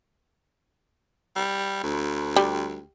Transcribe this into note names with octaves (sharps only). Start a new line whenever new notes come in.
G3
D2
G3